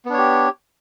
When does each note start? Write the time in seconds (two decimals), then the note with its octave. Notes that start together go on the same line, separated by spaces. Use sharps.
0.05 B3
0.10 D4
0.14 C#5
0.18 G4